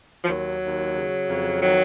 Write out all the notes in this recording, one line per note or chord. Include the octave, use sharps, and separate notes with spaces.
F3
D#2 F#3
D#2
C#3
F2
D#3 F#3